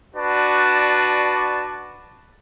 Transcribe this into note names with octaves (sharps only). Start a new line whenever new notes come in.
D4 F#4 B4 D5 A5